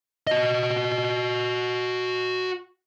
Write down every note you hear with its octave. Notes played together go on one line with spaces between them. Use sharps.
F#4 D#5